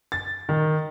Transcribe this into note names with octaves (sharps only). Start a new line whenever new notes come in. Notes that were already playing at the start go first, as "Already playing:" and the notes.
A6
D#3